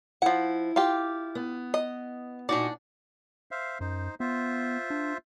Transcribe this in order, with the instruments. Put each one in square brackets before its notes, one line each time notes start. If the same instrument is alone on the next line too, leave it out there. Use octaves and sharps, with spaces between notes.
[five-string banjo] F3 F#5 [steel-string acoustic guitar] E4
[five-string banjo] F4 G4
[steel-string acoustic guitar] B3
[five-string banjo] D#5
[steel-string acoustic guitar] A#2 D#4 F#4 [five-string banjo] D4 D5
[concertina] C5 E5 F5
[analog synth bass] F#2 [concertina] D#4 C5
[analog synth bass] B3 [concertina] F4 C5 E5
[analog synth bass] D4